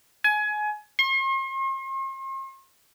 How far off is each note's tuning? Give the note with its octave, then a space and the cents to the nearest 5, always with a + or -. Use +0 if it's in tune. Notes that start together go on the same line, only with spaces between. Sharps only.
G#5 +25
C6 +45